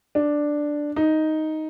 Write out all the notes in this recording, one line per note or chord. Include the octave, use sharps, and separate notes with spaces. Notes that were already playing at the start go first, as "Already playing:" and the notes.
D4
D#4